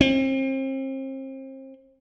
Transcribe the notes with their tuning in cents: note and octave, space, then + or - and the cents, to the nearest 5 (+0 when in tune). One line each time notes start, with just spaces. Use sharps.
C4 +35